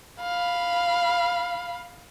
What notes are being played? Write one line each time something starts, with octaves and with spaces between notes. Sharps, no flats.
F5 B5